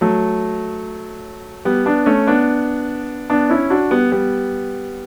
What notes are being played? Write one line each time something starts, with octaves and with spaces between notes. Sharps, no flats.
F#3 A3
G3 B3
B3 D4
A3 C#4
B3 D4
B3 D4
C#4 E4
D4 F#4
G3 B3
G3 B3